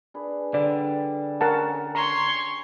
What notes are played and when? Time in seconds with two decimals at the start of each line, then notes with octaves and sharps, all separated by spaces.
0.14 D4 G#4 B4
0.54 D3 G3 D5
1.41 C#4 A#4 F5 F#5 A5
1.95 C#5 A#5 C6 C#6